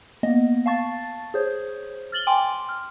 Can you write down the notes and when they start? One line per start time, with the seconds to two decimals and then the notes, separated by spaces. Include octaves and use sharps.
0.23 A#3 B3 D#5
0.66 F5 A5 C#6 A6
1.34 G#4 C5 C#5
2.12 F6 A6 F#7 G7
2.27 G5 G#5 C6 D6
2.69 F6